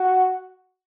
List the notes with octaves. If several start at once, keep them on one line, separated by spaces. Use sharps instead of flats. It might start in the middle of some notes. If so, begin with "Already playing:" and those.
Already playing: F#4